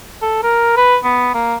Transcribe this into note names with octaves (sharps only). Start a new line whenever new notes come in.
A4
A#4
B4
B3
A#3